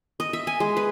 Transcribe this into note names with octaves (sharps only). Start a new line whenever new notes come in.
D#5
E5
G#5
G#3
B4